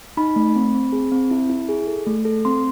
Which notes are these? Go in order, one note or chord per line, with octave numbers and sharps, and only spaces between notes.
D#4 B5
A3
C4
C4
G#4
C4
E4
E4
G#4
A4
A3
A4
C4 C6